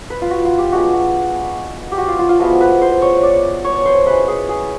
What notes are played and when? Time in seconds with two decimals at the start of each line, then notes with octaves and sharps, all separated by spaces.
0.10 B4
0.22 F4
0.31 F#4
0.45 F4
0.58 G4
0.72 G#3 B3 D4 F#4
0.93 F#4
1.92 G4
1.98 F#4
2.08 F4
2.19 F4
2.29 F4
2.39 F3 G#3 B3 E4 F#4
2.61 B4
2.82 C5
3.02 C#5
3.23 D5
3.65 C#5
3.86 C5
4.06 G#3 C#4 E4 B4
4.28 G#4
4.49 G#4